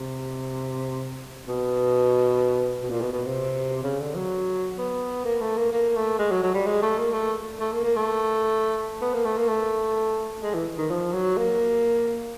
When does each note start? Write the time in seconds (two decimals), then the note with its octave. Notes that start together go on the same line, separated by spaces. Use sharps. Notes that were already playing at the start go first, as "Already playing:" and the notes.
Already playing: C3
1.48 B2
2.83 B2
2.90 A#2
3.01 B2
3.13 B2
3.26 C3
3.83 C#3
4.00 D3
4.15 F#3
4.78 B3
5.25 A#3
5.41 A3
5.57 A#3
5.72 A#3
5.96 A3
6.19 G#3
6.31 F#3
6.43 F#3
6.54 G3
6.67 G#3
6.82 A3
6.98 A#3
7.13 A3
7.60 A3
7.73 A#3
7.84 A#3
7.96 A3
9.01 B3
9.14 A#3
9.25 A3
9.37 A#3
9.48 A3
10.43 G#3
10.54 E3
10.78 D#3
10.90 F3
11.13 F#3
11.37 A#3